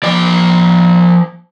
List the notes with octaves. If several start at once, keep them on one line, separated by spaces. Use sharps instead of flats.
F3 D5